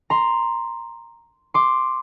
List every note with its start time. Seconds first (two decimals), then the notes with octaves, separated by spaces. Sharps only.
0.10 A#5 C6
1.54 C6 D6